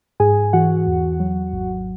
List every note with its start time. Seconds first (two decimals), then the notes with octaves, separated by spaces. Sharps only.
0.20 G#2 G#4 G#5
0.53 E3 F#4 F#5
0.87 E2
1.20 F#3
1.53 G#1